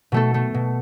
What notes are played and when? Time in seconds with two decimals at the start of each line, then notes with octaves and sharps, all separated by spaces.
0.12 B2 A3 A4
0.34 A3
0.54 B2